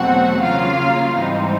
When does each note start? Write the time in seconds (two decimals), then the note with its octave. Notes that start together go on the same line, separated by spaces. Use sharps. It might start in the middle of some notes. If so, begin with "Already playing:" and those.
Already playing: E2 B2 F#3 A3 C4 F#4 F#5
0.41 C#3 F#3 A#3 F4 F5
1.14 G#2 E3 G3 C4 D#4